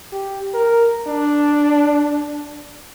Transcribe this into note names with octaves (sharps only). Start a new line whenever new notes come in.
G4
A#4
D4